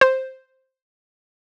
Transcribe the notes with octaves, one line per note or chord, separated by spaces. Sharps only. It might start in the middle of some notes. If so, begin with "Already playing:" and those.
C5